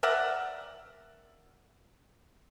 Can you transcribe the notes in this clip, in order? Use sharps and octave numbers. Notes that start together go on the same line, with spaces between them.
A#4 D5 E5 F#5